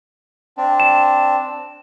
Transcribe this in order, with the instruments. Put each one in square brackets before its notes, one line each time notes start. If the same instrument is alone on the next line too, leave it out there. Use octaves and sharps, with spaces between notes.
[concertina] C4 D4
[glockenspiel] E7